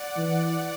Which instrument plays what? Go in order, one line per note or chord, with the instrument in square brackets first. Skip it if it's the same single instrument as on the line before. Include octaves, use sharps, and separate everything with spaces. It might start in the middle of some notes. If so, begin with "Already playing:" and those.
Already playing: [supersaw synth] D5 F#5
[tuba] E3